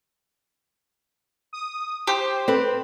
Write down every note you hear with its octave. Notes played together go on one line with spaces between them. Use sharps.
D#6
G4 C5
C4 A4 B4